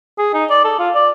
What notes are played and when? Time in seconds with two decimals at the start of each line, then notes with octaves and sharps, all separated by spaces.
0.19 G#4
0.34 D#4
0.50 D5
0.65 A4
0.79 F4
0.95 D5